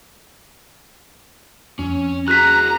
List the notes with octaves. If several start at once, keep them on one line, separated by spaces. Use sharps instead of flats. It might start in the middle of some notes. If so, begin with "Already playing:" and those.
F2 C#4
F#4 G#4 A#5 F#6 B6